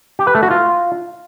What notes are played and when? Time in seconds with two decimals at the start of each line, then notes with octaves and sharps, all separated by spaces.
0.19 G4
0.27 B4
0.35 A3
0.43 F#4
0.51 F4